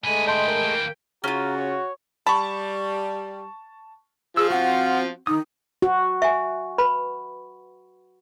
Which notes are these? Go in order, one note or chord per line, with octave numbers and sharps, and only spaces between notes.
D3 G#3 A3 B4 G#5
D#5 G5 A5 C6
A#4
E3 A#3
C#3 C#4 F4 F#4 A#5
C#5
G3 A5 B5 C#6
F3 F4 G#4 E6
C4 F#4 F#5
D#3 D#4 D#6
F#4
E5 G#5
B4 B5